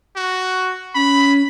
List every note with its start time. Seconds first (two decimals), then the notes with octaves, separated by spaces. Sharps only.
0.16 F#4
0.95 C#4 B5